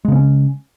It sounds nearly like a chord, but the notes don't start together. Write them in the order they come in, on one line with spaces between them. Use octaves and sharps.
G#3 C#3 B3 C#4